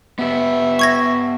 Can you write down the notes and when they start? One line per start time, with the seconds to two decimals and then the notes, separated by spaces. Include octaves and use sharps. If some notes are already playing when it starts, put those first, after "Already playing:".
0.19 B3 G4 B4 E5
0.79 C#6 G#6 A#6